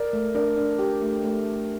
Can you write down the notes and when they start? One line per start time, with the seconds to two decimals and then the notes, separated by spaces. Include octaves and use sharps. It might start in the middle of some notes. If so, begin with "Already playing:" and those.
Already playing: A#4 D5
0.13 A3
0.35 D4 A#4 D5
0.57 D4
0.79 G4
1.02 A3
1.24 A3